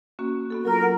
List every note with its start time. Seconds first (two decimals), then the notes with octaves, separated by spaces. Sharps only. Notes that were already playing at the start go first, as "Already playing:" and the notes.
0.19 A#3 C#4 F#4
0.50 B3 F#4 A4
0.65 F#3 F4 A#4
0.82 F#5